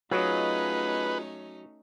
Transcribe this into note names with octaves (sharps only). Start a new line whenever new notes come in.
F#3 A3 C#4 D#4 F4 G#4 B4 D#5